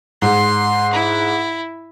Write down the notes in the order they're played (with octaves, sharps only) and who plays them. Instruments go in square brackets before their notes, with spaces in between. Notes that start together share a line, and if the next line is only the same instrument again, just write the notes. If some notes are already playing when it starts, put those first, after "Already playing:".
[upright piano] G#2 [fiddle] C6
[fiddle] E4